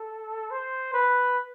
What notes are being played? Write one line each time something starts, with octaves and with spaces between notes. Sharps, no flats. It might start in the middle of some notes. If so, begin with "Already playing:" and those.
Already playing: A4
C5
B4